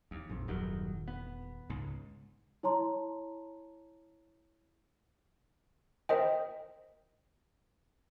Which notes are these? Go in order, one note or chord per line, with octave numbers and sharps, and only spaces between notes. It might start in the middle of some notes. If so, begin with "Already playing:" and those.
D#2
A#1 F2
D#1 E2 G2 D#3 F#3
B3
C#2 G#2
E4 C#5 A5 A#5 C6
A#4 C5 D#5 G5